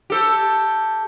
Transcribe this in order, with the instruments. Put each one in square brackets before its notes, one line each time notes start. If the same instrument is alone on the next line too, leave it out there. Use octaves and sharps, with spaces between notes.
[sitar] G4 A4